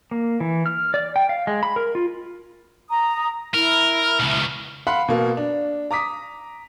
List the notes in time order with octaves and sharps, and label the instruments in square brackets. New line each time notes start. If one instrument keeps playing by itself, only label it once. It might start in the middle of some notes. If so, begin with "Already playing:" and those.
[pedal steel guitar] A#3
E3
F6
D5
G5
F5
G#3
B5
A#4
F4
[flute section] A#5 D#6
[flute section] E4 F6 [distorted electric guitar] A#4
[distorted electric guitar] C#2 B2
[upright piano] F5 F#5 B5 C6
B2 A#3
D4
A#5 D6 D#6 B6